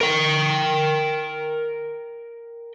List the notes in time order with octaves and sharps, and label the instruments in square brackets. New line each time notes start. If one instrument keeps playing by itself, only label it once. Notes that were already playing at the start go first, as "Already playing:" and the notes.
[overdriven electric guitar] A#4 G5